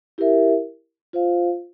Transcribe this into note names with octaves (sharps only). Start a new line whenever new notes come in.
E4 G4 A#4 E5
F4 C5 F5